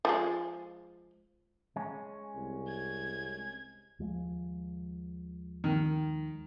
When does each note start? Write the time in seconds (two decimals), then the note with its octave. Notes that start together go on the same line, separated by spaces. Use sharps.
0.05 F3 G#3
1.76 G#3 C#4
2.36 C2
2.68 G#6
3.99 D#2 F3 G#3
5.64 D#3